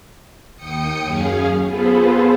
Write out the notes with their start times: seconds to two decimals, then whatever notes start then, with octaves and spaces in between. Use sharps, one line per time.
0.56 D#2 G5 D#6 C#7
1.05 F#2 C#4 G#4 F5
1.66 B3 F4 G#4 A4 B4 C5